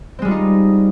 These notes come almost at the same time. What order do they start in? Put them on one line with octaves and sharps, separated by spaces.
C4 G#3 G3 F4 D#4